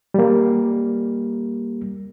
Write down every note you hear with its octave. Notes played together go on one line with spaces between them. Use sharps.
G3 A#3